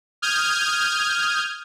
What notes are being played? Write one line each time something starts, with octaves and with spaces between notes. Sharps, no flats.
D#6 F6 G6 G#6